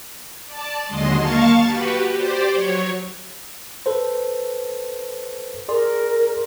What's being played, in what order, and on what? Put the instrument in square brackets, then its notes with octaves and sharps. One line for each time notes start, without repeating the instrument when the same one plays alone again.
[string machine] D5 A5
D#2 D3 F#3 G#3 D#5 C6
A#3 F5 A5 C#6 A6
F#4 G4 B4
G4 C5 D5
F#3 C#5
[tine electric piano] A4 B4 C5
[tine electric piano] G#4 D5 C6 [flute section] A#4